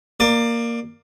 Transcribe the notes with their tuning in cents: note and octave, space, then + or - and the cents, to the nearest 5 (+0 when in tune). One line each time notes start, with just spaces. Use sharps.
A#3 +0 D5 +20